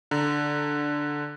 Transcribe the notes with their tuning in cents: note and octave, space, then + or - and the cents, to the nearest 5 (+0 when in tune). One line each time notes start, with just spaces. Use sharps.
D3 +0 A#5 +0